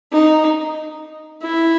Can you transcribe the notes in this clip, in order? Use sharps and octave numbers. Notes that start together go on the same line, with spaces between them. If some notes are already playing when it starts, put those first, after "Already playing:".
D#4
E4